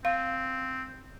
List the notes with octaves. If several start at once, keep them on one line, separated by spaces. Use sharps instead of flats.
C4 F5